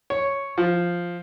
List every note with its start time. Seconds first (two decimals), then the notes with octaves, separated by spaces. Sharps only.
0.10 C#5
0.58 F3